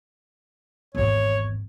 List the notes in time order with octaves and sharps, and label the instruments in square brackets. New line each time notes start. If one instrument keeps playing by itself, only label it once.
[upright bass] G#1 E2 [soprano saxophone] C#5